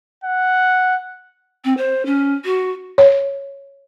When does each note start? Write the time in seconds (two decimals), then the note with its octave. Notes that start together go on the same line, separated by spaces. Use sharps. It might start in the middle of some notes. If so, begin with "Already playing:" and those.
0.24 F#5
1.64 C4
1.77 C5
2.06 C#4
2.45 F#4
2.98 C#5